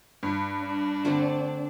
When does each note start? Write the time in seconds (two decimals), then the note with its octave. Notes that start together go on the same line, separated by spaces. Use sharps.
0.23 G2
0.62 D4
1.05 D3 A3 C4